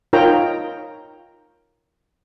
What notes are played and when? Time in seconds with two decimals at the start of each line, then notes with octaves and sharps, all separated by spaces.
0.13 D#4 F4 A#4 C#5 G5 A#5